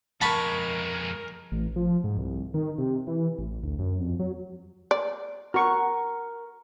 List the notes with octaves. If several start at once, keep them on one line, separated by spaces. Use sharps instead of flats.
F2 G#3 A#4 A5 B5 C#6
A1
F3
G#2
C2
D#3
C3
E3
A1
D2
F#2
F2
F#3
D5
F#4 A#4 C#6